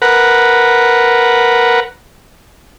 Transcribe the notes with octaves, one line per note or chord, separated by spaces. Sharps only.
A#4 B4 F#5